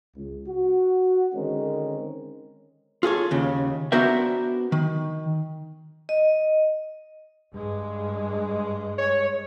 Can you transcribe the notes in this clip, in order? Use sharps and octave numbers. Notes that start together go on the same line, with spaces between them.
C#2
F#4
D3 D#3 G#3 C4 C#4 A#4
F4 G#4 A4 C#5
D#2 C#3
B3 D4 F#4 A#4 C5 E5
D#3
D#5
G2 G#3
C#5